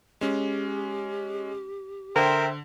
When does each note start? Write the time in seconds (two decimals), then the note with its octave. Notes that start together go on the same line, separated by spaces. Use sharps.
0.21 G#3 C#4 G4
2.16 D3 A#4 C5 E5 G5